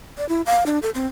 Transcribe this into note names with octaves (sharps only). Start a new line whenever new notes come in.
D5
E4
F5
D4
A4
C4